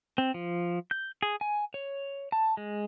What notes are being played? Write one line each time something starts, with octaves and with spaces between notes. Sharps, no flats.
C4
F3
G6
G#4
G#5
C#5
A5
G#3